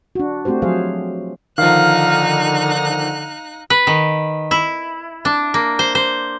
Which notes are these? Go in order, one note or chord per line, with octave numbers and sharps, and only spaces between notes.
D4 F#4
A3 C4 F#4 G4 C5
F3 F#3 G#4 C5 F5
D3 D#3 F3 D#4 F5 F#6
B4
D#3
E4
D4
A#3
C5
C5